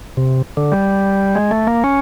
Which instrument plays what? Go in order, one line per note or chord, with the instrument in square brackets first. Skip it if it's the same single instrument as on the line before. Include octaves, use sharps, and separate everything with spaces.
[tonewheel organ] C3
D3
G3
G#3
A3
A#3
C#4